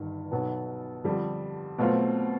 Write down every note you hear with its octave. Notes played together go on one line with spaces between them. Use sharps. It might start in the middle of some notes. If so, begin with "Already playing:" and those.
Already playing: G1 G2 D#3
B1 B2 F#3 B3
F2 D3 G3
B2 F#3 A3 C4 F4